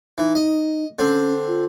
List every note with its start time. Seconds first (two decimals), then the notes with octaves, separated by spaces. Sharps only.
0.18 E3 D#4
0.35 D#5
0.99 D3 C4 C#4
1.47 F4